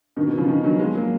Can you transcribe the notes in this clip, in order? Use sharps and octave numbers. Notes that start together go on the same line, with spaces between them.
B2 D#3
B2 D#3
C#3 F3
B2 D#3
D#3 F#3
F3 G#3
F#3 A#3